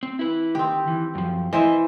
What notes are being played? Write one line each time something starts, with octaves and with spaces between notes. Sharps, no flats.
C4
E4 B4
D#3 C4 G4
E3
F#2 F3
E3 C5 D#5 E5